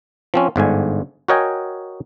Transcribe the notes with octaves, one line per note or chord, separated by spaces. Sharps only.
F3 C4 C#4
G1 G#2 D3 G#5
F#4 A#4 C#5 D#5 G5 G#5